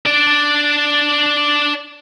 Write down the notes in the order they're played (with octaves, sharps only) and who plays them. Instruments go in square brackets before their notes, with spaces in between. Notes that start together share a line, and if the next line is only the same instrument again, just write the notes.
[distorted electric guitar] D4 D5